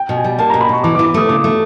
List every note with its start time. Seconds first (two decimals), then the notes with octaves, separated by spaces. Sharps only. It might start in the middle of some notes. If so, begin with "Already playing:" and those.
Already playing: G5
0.09 B2
0.17 G#5
0.24 G3
0.38 A#3 A5
0.50 B2 A#5
0.61 B5
0.69 B2 C#6
0.83 E3 D6
0.95 D6
0.99 E3
1.06 D6
1.14 A3 D#6
1.29 C#3 D6
1.44 A3